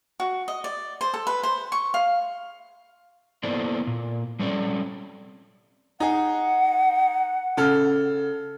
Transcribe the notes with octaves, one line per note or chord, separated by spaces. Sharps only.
F#4
D#5
D5
C5
A4
B4
C5
C#6
F5
A#3 B3 E4 A4 C5 D5
A#2
G3 C4 C#4 A4 C5 D5
D#4 G#4 F#5
C#3 A4 F6